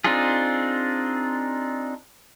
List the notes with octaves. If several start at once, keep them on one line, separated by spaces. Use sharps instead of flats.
C4 D4 D#4 F4 G#4